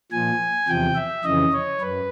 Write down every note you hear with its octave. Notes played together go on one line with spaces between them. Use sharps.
A#2 F3 G#5
E2 C3 F3 G5
E5
F2 C#3 E3 D#5
C#5
F#2 B4